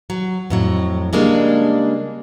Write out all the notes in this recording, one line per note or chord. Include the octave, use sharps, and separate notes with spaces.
F#3
F2 A2 F#3
C#3 G3 G#3 A#3 D4